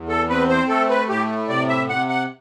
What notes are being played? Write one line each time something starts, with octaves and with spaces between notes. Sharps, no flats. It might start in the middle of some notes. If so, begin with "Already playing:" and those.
Already playing: E2
A4
C4 B4
C5
A3 A4
B4
A2 G4
C3 D5
E5
C3 F#5
F#5